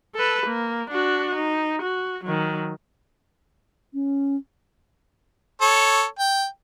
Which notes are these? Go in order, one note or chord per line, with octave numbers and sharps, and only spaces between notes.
A4 B4
A#3
D4 F#4
D#4
F#4
D#3 F#3
C#4
A4 C#5
G5